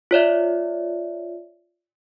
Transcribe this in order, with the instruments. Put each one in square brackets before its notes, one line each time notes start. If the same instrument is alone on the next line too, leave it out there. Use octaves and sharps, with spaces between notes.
[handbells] F4 C#5 D5 E5